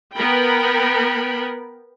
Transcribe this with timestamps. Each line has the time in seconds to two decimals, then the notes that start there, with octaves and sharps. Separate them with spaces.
0.14 B3 A#4 G5 B5